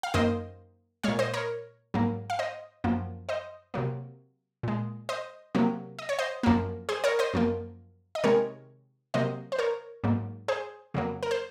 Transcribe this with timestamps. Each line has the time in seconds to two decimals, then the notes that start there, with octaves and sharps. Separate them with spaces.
0.03 F5
0.14 F#2 D#3 A#3 C5 D#5
1.03 A#2 G#3 C#5 F5
1.19 C5 D#5
1.34 A#4 C#5
1.94 G#2 F#3 A#3
2.30 F5
2.39 C5 D#5
2.84 F#2 F3 A#3
3.29 C5 D#5
3.74 C3 F#3 A#3
4.63 A#2 G#3
5.09 C5 D#5
5.55 C3 F#3 A#3
5.99 D#5
6.09 C#5
6.19 C5 D#5
6.43 F#2 F3 A#3
6.89 G#4 C5
7.04 A#4 C#5
7.19 C5 D#5
7.34 F#2 F3 A#3
8.15 D#5
8.24 C3 D#3 G#3 A#4 C#5
9.14 C3 F#3 A#3 C5 D#5
9.52 C5
9.59 A#4 C#5
10.04 G#2 F#3 A#3
10.48 G#4 C5
10.94 F2 C#3 F#3 A#3
11.23 A#4
11.31 C5